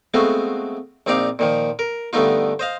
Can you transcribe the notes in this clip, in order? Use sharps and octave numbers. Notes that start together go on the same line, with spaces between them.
G#3 A3 B3 C4 F4 F#4
A#1 C4 D#4 D5 F5 D6
A#2 D#3 F3
A#4
G2 D3 A3 B3 D#4 F4
C5 D#5 F5